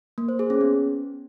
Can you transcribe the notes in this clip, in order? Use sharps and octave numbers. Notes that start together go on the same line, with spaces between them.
A#3
C5
G#4
C#4
B3